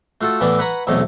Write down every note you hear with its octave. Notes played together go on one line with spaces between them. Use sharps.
A3 F4 F#4 A4
A2 E3 A3 B3 D4
B4 F#5 G#5 A#5 B5 C#6
B1 E2 C3 A3 C#5 D#5